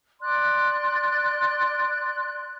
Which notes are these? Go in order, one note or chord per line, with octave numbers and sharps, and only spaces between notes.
D5 C6 F#6